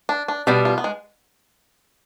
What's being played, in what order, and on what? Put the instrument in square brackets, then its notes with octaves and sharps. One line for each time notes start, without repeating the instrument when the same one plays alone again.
[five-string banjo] D4
D4
[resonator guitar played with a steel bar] B2 G3 B3 [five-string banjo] D4
[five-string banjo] F4
B3
G#3